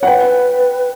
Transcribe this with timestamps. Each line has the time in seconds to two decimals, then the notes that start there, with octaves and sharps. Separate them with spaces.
0.01 C#5 F#5
0.07 B4 G5